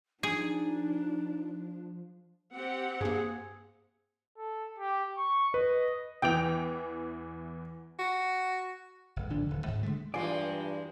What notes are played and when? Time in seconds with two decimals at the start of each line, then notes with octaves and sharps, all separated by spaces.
0.23 F3 D4 D#4 G#4
2.53 C4 G4 F#5
3.01 G2 A#3 G#4
4.38 A4
4.78 G4
5.17 C#6
5.54 B4 D#5
6.22 E2 E3 G5 F7
7.99 F#4
9.16 F1 G#2
9.30 G#1 D3 F3 D4
9.46 D1 D3 D#3
9.66 D2 G#2
9.83 D3 E3 G#3 A3
10.14 E2 G2 G#3 F4 D5 G#5